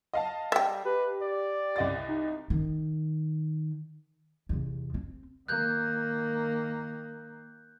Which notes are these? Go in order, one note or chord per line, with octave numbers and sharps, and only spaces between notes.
D#5 F5 A5
G3 E5 G5
G4 B4
D5
C2 D#5 A6
D#4
D#3
E2 C3
C4
D#3 A#3 F#6 G6